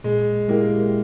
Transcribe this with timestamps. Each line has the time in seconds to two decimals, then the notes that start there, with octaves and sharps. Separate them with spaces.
0.04 A#2 G#3
0.48 G#3 A#3 E4 G4